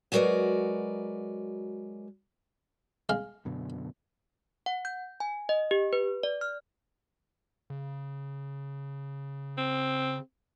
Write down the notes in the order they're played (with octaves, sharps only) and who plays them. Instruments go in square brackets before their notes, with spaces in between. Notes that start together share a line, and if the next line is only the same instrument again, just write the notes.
[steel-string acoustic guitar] F#3 G#3 F#4 A#4 B4 D5
[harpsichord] G#3 F5
[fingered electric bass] F#2 B2 D3
[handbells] F#5
G6
G#5
D#5
G4
B4
D5
F6
[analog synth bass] C#3
[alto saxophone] C4